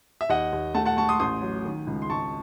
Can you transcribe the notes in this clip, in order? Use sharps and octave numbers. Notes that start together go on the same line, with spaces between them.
E5
D#2 D#5 F#5
D#2
A3 F#5 A5
F#5 A5
A3 A5 C#6
C6 D#6
A1 C6 D#6
F#3
D#3
C#2
C6
G#1 A5 C#6